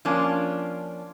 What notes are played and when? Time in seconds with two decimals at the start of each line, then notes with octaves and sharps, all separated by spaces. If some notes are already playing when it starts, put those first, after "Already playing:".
0.05 F3 A#3 C#4 D4 F4